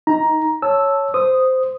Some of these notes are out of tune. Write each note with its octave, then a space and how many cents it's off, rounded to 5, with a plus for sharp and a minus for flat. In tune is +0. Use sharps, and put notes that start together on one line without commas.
D#4 +15 A#5 +10
C#5 +0 A5 +0 E6 -5
C5 -10 D#6 -5